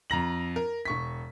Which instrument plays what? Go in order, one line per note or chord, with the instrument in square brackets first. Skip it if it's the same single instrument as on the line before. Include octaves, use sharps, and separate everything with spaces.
[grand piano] F2 A#5 A#6 F#7
A#4
E1 C#6 B6